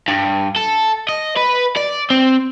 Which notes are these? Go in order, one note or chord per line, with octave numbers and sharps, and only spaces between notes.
G2
A4
D#5
B4
D5
C4